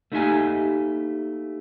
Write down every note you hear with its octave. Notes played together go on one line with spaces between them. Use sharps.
A3 A#3 D#4 G4 E5 G#5